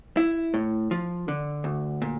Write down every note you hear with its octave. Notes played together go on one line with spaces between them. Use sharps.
E4
A2
F3
D3
D2
A#2